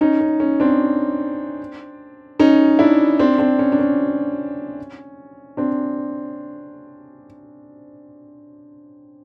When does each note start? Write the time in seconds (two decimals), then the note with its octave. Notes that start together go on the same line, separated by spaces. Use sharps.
0.01 C#4 D#4
0.21 C#4
0.40 C#4
0.60 C4 D4
2.39 C#4 D#4
2.79 D4 E4
3.19 C4 D4
3.38 C4 D4
3.59 C#4
3.72 D4
3.79 C#4
5.57 C4 D4